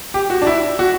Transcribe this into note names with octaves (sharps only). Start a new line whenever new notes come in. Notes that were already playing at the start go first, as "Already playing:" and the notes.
G4
F#4
D4
E4
F#4